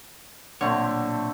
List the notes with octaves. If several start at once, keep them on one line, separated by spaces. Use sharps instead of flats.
B1 A#2 D3 A3 C4 C#5